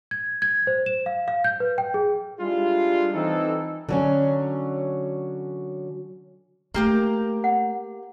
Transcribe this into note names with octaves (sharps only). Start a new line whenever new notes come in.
G#6
G#6
C5
E7
F5
F5
G6
B4
G5
G#4
G3 G#3 D4 E4 F4
E3 C4 D#4 A4
D3 F#3 C#4
A3 A#3 G4 A#4
F#5